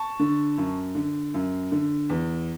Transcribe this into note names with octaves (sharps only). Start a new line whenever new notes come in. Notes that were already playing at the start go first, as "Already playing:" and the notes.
Already playing: A5 C#6
D3
F#2
D3
F#2
D3
E2